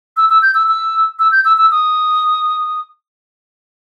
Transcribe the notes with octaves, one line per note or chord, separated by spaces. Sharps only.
E6
E6
G6
E6
E6
E6
G6
E6
E6
D#6